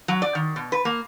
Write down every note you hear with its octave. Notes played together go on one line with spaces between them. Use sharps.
F#3
D5
D#3
B2
B4
A#3